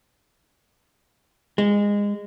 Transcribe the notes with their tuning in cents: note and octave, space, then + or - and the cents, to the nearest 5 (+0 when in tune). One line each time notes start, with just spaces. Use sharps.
G#3 -20